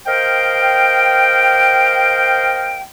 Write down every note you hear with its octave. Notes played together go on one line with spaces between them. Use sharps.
A#4 C5 D#5 F5 G5